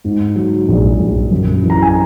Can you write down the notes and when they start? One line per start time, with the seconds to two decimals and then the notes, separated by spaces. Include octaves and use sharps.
0.04 G#2
0.36 F#3
0.68 A#1
1.00 A#1
1.31 F#2
1.63 E3
1.70 A#5
1.82 G#5